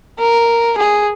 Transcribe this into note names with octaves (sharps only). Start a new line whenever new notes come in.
A#4
G#4